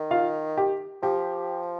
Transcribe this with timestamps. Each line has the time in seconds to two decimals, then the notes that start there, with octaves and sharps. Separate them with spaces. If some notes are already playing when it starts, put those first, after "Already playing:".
Already playing: D#3
0.11 F4 F5
0.58 G4
1.03 F3 G4